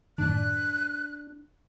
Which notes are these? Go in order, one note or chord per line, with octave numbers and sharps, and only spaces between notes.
F#2 A2 D#3 D4 F#6